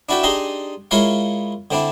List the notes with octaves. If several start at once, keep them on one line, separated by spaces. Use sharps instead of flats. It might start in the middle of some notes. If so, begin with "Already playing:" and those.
D4 E4 F#4 A4 E5 G5
D4 D#4 G4 G#4 A#5 C6
G#3 E4 F4 A#4 C#5 F5
D3 C4 D4 E4